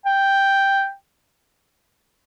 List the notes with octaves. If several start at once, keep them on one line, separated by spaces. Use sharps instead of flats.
G5